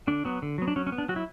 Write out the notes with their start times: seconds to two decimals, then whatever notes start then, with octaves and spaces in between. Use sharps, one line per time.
0.07 D3 D4
0.25 F#3 B3
0.42 D3
0.58 F#3 B3
0.68 D4
0.76 F#3 C#4
0.87 C#4
0.92 B3
0.98 D4
1.09 F#3 F#4
1.16 E4